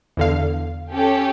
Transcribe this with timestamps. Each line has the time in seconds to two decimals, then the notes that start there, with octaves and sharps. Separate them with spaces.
0.17 E2 D3 F5
0.92 C#4 G4 A4